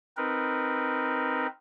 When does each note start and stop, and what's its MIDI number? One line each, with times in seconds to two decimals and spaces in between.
0.17 1.47 60
0.17 1.47 63
0.17 1.47 70
0.17 1.47 71